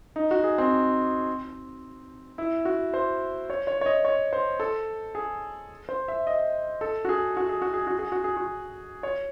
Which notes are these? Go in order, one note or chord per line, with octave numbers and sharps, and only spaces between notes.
D#4
F#4
G#4
C4
E4
F#4
C5
C#5
C#5
C#5
D#5
C#5
C5
A4
G#4
C5
E5
D#5
A4
F#4
G#4
F#4
G#4
F#4
G#4
F#4
G#4
F#4
G#4
F#4
C#5